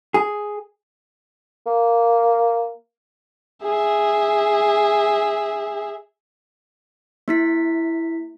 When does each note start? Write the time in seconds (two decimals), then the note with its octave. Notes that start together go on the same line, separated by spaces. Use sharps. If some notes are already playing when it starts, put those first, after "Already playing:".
0.14 G#4
1.66 A#3
3.63 G#4 E5
7.28 A#3 E4 B6